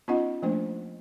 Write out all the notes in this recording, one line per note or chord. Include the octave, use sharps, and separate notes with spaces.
B3 C#4 D#4 F4 D#5 F#5
F3 A3 A#3 D4 C5